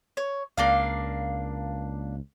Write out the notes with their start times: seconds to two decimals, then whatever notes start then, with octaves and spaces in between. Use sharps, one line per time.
0.17 C#5
0.57 C#2 A#3 D4 F5